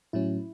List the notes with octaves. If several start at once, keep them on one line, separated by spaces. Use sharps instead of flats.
A2 F#3 C#4 E4